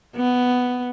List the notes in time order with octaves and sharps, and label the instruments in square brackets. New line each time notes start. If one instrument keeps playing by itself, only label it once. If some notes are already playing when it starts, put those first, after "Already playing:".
[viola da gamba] B3